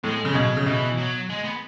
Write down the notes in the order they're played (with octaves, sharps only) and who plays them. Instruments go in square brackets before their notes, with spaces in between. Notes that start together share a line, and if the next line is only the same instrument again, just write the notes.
[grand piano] A2 [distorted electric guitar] G#3
[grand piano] C#3 [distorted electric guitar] G#3
[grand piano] B2 [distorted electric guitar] F#3
[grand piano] C#3
[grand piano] B2 [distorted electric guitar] E3
[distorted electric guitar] F#3
G#3
B3